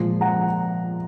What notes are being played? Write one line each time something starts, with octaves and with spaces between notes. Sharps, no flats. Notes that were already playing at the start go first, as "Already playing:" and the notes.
Already playing: A#2 F3 G#3
F#5 A#5